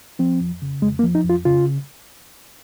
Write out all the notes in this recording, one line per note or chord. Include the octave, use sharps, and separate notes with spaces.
F3 C4
F2
C#3
F2 G#3
A#3
F3
D#4
F2
F4
C#3 F4